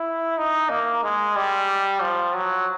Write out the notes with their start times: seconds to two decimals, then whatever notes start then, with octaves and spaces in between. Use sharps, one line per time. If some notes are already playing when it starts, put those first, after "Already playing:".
Already playing: E4
0.37 D#4
0.70 A#3
1.04 G#3
1.36 G3
2.02 F3
2.35 F#3